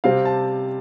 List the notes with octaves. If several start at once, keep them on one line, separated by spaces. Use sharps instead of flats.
C3 G3 C4 F5
A5